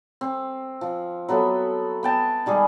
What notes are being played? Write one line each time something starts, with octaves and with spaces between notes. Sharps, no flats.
C4
F3
F#3 B3 A4 E5
B3 G5 A5
D#3 G3 G#3 G#4